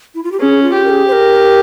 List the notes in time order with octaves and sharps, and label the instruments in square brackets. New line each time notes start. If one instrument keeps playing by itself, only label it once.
[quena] E4
F4
G4
[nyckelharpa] C#4 [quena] G#4
[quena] F4
[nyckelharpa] G4
[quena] A#4
G#4
C5
A#4